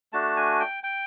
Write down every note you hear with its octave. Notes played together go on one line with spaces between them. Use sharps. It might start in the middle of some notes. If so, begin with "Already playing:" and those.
A3 D4 F#4 A5
G#5
G5
G5